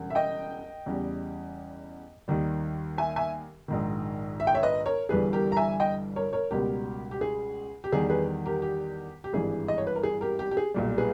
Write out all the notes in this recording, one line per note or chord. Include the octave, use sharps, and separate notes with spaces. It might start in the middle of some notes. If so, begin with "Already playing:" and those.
Already playing: E1 E2 C#3 G3
E5
D#5 G5
E2 C#3 G3
D#2 D#3 G3
E5 G#5
E5 G#5
A#1 G#2 D#3
E5
G5
C#5 E5
B4 D#5
A#4 C#5
G1 G2 E3 G3 G#4 B4
G4 A#4
A#5
E5 G#5
D#5 G5
A#4 C#5
A#4 C#5
C#2 B2 G3 G4 A#4
G4
G#4
G4
E2 D#3 G3 G#4
G#4 B4
G4 A#4
G4
G4
G#1 G2 E3 G3 G#4
D#5
C#5
B4
A#4
G#4
G4 A#4
G4
G4
G#4
B1 A#2 G3
G#4 B4